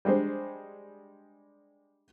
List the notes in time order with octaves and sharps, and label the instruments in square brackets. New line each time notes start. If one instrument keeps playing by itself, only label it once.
[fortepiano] G3 G#3 D4 C5